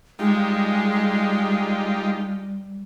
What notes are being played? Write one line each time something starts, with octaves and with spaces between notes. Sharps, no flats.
G3 G#3 D#4 F4 G4